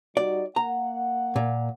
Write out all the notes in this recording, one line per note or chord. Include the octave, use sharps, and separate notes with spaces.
G3 D#4 F#4 D5
A#3 F#5 A#5
A#2